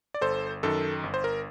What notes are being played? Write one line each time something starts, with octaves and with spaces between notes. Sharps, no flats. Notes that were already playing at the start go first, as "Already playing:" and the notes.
D5
G1 A4 C5
F#2 D#3 A4
G1
C5
A#4